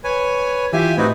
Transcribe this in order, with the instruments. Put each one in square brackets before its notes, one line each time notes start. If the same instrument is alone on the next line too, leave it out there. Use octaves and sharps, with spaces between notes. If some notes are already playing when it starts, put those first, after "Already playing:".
[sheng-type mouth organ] B4 C#5 G#5
[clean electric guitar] E3 F4 [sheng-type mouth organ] G4 G#5 [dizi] E5
[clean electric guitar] A2 [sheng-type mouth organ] C4 F#4 B4 [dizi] D#4